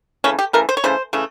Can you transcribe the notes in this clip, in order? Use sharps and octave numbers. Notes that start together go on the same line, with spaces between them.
C#3 E3 A3 C#4
G4
C#3 E3 A3 A#4
C5
C#5
C#3 E3 A3 C5
C#3 E3 A3